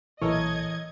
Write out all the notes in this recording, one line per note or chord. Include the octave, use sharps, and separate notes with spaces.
B1 A#2 E3 A4 A#4 C#5 D#5 G#6